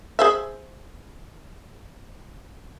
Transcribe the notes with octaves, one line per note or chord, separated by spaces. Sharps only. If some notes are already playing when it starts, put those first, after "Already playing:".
G#4 C5 E5